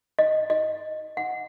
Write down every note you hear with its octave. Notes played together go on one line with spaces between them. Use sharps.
D#5
D#5
F#5